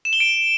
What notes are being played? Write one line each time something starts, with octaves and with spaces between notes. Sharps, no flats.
E7
G7
D7